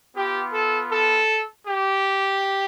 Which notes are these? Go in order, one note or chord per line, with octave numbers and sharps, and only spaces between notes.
B3 F4 G4
A4
A4
G4